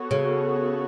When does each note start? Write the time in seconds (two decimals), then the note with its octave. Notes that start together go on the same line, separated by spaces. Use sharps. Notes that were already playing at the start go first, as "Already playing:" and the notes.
Already playing: B3 F#4 A4 C#5
0.11 C#3